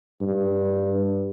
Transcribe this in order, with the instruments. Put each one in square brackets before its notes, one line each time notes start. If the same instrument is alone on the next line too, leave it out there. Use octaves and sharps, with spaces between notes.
[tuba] G2